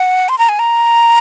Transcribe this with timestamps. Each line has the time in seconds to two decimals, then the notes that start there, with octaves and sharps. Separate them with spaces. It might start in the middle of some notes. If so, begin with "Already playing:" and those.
Already playing: F#5
0.29 C6
0.38 A#5
0.49 G#5
0.59 A#5